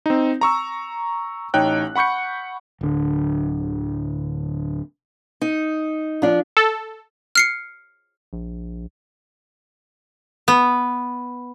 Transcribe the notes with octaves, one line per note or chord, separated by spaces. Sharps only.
C4 D#4
A#5 C#6 E6
A1 D#4 C#5 G5 F#6
F#5 B5 C#6 G6 C#7
D1 D3
D#4
F3 D4
A4
F6 C7 C#7
A#1
B3